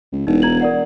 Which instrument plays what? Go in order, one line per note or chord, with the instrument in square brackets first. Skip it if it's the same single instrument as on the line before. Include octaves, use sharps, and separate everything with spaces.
[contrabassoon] C#2
[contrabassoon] E1 [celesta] D#4
[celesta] A#5 G#6 F#7
A#4 D5 F#5